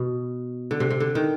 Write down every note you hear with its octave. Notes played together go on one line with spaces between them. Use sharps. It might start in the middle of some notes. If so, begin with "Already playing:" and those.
Already playing: B2
D3
C3
C3
D3
D#3